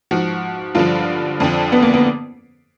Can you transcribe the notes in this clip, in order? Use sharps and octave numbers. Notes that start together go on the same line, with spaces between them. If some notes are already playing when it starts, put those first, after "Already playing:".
G#2 F3 F#4
G2 D3 F3 F4
F2 D3 F3
B3
A#3
B3